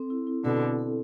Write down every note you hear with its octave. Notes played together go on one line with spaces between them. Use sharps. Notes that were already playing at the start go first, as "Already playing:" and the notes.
Already playing: C4 A4
E4
E4
B2 D3 A4
A4
A4